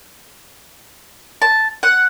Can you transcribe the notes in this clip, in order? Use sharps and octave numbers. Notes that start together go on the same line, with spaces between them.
A5
F#5